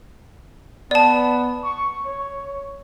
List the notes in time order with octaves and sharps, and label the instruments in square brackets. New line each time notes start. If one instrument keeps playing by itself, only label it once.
[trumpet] B3 [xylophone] D5 A5
[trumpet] C#6
C#5